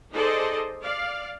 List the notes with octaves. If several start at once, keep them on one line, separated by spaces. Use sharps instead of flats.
D#4 G#4 A4 C5 D5 D#5
D5 F5